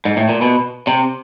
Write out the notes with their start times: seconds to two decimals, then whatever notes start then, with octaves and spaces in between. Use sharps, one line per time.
0.05 G#2
0.17 A2
0.29 A#2
0.41 B2
0.87 C3